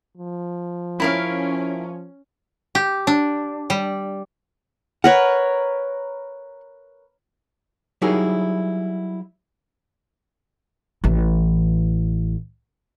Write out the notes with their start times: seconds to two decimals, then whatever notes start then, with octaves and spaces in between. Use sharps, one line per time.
0.18 F3
1.00 C#4 E4 A#4 F5
2.75 G4
3.07 D4
3.70 G3
5.04 A#4 B4 C#5 F#5
8.02 F#3 G3 D#4 E4 G#4 A#4
11.04 A1 E3